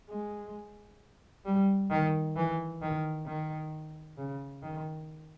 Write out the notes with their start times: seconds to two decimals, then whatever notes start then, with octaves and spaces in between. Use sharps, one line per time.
0.10 G#3
1.45 G3
1.90 D#3
2.36 E3
2.82 D#3
3.27 D#3
4.18 C#3
4.63 D#3